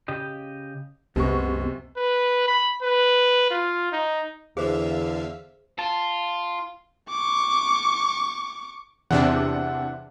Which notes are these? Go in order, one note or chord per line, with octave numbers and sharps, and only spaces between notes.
C#3 G4 D#5
C2 F#2 C3 G#3 B3 C#6
B4
B5
B4
F4
D#4
E2 D3 G#4 C5 E5 F5
F4 A5
C#6 D6
E2 C3 D4 E5 F#5